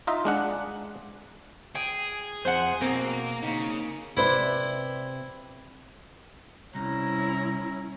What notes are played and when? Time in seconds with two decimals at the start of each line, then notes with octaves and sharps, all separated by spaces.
0.07 D#4 F4 D#5 E5
0.25 G#3 D4 F#5
1.75 G#4 G5
2.45 F2 C5 F#5
2.81 B2 F#3 A#3 C4 A#4
3.43 C#3 A#3 D#4
4.17 C3 E4 B4 C5 D5
6.75 C2 C#4 E4 A#5